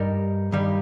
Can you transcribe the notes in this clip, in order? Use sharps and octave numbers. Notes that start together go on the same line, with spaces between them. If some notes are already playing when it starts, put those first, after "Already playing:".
Already playing: G2 G3 D#4 A#4
G2 D#3 G3